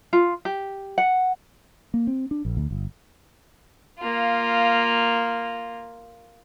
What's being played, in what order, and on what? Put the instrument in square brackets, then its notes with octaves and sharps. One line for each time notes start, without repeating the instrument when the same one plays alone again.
[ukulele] F4
G4
F#5
[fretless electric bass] A#3
C4
D4
A#1
D2
G1
[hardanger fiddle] A#3 F4